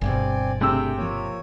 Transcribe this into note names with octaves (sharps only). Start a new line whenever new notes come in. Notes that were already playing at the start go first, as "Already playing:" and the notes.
G1 G2 B2 C4 D5 G#5
C3 A3 D4 G#4 G5 E6
F3 A#3 C#5